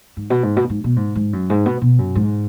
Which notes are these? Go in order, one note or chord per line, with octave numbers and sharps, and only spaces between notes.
G#2
B2
G#2
B2
G#2
B2
G#2
G#2
F#2
G#2
B2
B2
F#2
G#2